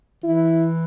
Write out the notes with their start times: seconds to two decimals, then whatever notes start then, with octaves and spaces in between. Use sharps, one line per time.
0.24 E3 E4